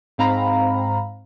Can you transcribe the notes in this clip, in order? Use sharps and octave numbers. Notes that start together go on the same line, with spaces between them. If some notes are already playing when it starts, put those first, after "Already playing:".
G#2 C4 F5 A#5 B5